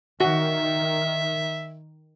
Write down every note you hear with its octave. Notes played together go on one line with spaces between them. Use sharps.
D#3 F#4 E5